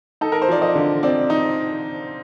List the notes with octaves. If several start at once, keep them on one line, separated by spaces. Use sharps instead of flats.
D#4 A4
A#4
C5
F3 D5
D#5
D3
C4 D5
D#4